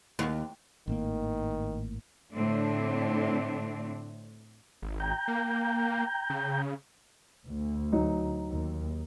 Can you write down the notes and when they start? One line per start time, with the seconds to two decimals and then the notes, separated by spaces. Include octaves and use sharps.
0.19 D#2
0.88 G#1 A2 D#3 A#3
2.33 A2 D3 A3 C4 D4
4.82 G#1
5.00 G5 A#5 G6
5.28 A#3
6.30 C#3
7.46 D2
7.93 F#3 D#4
8.49 D#2